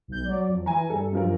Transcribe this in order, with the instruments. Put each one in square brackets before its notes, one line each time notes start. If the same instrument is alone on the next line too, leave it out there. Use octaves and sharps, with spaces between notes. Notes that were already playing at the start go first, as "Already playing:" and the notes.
[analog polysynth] B1 G6
F#3 D5
F2
[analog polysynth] E3 [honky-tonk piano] G#5 A#5
[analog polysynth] G2 [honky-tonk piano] A4
[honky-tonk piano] F#2 F3 A#4